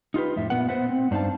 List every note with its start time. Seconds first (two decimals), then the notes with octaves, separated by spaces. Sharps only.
0.14 D#4 F4 G4 B4
0.36 F2 A2 E5
0.50 A#2 B3 B4 F#5
0.69 B3 B4 C5 E5 F#5
0.89 C4
1.11 G2 D4 D#4 C5 F5 A5